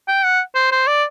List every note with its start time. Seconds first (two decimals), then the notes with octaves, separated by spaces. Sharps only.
0.08 G5
0.24 F#5
0.55 C5
0.72 C5
0.87 D5